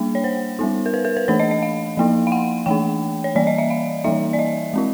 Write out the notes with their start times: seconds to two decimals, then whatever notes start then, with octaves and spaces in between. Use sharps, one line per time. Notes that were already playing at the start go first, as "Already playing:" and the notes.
Already playing: G3 A#3 D4
0.15 C#5
0.24 C5
0.59 G3 B3 D#4
0.86 A#4
0.94 B4
1.05 A#4
1.17 B4
1.28 E3 A3 D4 C5
1.40 D#5
1.51 D#5
1.63 F5
1.97 F3 A#3 D#4
2.27 F5
2.32 F#5
2.66 E3 A3 D4 G5
3.24 C#5
3.35 E3 G3 A#3 D5
3.47 D#5
3.58 E5
3.70 F5
4.04 E3 G3 A#3 D#4 E5
4.33 D5
4.39 D#5
4.74 G#3 C4 E4